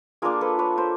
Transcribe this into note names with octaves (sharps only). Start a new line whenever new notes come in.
A#3 D4 F4 G#4 A#4
A4 B4
B4 C#5
A#4 C5